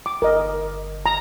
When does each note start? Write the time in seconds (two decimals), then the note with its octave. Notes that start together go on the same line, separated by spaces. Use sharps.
0.06 D6
0.22 G1 A#4 D#5
1.06 A#5